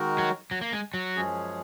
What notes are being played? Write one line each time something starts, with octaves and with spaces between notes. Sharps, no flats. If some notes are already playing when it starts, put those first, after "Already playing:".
Already playing: D#3 G#3 D#4 F#4 A#4
F#3
F#3
A#3
G#3
F#3
F#2 F3 G#3 C#4 G#4